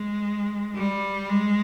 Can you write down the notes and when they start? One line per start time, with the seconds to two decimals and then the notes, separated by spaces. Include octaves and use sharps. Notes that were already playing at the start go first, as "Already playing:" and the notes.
Already playing: G#3
0.75 G3
1.30 G#3